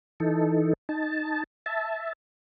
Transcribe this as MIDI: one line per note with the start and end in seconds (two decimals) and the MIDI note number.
0.20 0.73 52
0.20 0.73 63
0.20 0.73 69
0.89 1.44 63
0.89 1.44 81
1.66 2.13 76
1.66 2.13 81